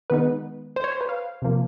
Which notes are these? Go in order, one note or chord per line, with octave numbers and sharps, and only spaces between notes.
D#3 G#3 B3 D#4 B4
C5
C#5
C5
B4
F5
C3 F3 A#3